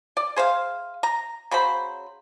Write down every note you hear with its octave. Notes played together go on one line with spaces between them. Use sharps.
D5
G#4 C5 E5 F5
A#5
C#3 F#3 C5 B5